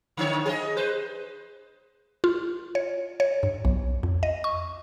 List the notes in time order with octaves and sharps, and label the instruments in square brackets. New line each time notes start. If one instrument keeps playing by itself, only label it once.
[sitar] D3 D#3 C#5
G#4 B4 D#5
B4 C5
[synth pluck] F4
C#5
C#5
G2
B1
F2
D#5
C#6